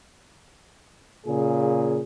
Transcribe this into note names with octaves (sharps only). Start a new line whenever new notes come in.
A#2 C#3 G#4